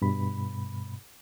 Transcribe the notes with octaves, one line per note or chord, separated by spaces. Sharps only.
G2 B2 B5